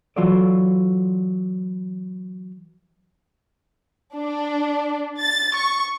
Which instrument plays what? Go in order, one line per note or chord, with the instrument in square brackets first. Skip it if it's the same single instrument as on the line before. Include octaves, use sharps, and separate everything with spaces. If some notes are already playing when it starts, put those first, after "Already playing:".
[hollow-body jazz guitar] E3 F#3 F4 F#4 A4 D5
[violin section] D4
A6
C#6